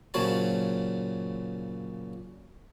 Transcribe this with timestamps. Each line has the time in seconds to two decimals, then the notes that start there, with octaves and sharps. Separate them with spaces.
0.14 A#2 C#3 F#3 C5 C#5 A5